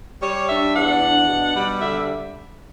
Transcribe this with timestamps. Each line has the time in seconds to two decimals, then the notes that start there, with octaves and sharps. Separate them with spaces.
0.22 G3 C#5
0.49 D4 E5
0.76 E2 F#5
1.02 D4
1.29 B2
1.55 G3
1.81 D3 E5